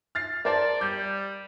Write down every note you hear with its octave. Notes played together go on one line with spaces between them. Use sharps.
F6 A6 C7
A#4 C5 D5 A5
G3 G6